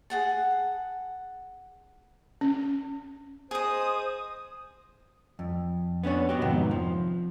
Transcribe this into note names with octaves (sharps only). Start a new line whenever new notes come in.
G#4 F#5 A5
C#4
G#4 C5 D#5 D#6
F2
B3 C#4 D4 C#5
B3 F#4 G4
F2 G#2 C3 D#3 B3
F3